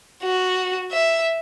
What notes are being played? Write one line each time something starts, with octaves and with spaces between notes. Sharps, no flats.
F#4
E5